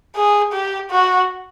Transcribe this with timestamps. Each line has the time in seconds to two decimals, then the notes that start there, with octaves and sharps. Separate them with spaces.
0.16 G#4
0.53 G4
0.91 F#4